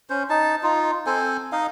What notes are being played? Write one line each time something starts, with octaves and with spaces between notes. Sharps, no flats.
C#4 C5
D#4 A5
D#4 F4
C4 A4 C5 G#5
D#4 D#5 F5